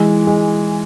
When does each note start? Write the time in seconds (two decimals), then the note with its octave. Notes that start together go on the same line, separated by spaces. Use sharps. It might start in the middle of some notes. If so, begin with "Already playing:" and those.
Already playing: E3 G#3
0.27 G#3